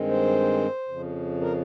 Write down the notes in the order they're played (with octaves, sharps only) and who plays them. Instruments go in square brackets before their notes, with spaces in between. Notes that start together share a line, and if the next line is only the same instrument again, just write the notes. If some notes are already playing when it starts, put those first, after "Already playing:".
Already playing: [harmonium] G2 D#3 G#3 C4
C5
F2 C#3 F3
A#4